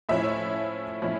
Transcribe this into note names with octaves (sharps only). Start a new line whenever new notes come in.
A2 F3 C#4 E4 E5
A2 F3 C#4 E4